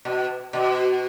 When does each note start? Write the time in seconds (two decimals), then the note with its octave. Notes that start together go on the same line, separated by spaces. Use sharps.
0.05 B2
0.53 B2